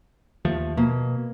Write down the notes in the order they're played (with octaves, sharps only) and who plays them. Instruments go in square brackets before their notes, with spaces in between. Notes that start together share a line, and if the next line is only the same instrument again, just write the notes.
[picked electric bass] D#2 F3 A3
[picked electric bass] B2 [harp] A#3